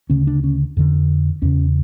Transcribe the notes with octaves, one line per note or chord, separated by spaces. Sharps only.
D2 C#3 C#4
D4
C#4
F2 D3
E2 C#3 C#4